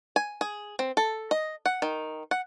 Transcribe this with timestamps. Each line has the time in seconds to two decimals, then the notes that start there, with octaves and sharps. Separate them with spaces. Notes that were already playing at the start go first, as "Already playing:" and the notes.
0.16 G#5
0.41 G#4
0.79 C4
0.97 A4
1.31 D#5
1.66 F#5
1.82 D#3
2.31 F#5